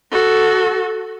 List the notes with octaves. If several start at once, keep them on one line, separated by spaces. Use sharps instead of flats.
F#4 A4